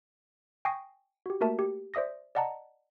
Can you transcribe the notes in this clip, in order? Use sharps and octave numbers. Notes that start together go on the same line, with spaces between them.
G5 G#5 C#6 D#6 A#6 C7
F#4 G4
A3 A#3 F#4 A#4 E5 A5
G4
C5 D5 E5 D#6 A#6
D5 D#5 F#5 A5 A#5